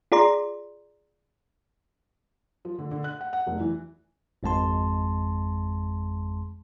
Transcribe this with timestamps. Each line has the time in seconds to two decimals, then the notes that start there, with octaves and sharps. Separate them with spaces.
0.12 F4 G#4 D5 A#5 C6
2.65 F3
2.78 D3
2.91 D3
3.04 F#6
3.21 F#5
3.33 F#5
3.47 F1
3.60 E3
4.43 G#1 F2 G#3 A5 C6